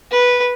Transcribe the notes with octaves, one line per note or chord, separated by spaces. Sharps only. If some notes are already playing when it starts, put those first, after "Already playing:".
B4